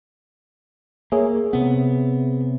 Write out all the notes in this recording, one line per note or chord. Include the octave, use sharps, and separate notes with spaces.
A#3 G#4 C#5 E5
C3 B3